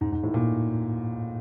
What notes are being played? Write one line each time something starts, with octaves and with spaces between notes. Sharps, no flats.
G#2
G#2
A2
A#2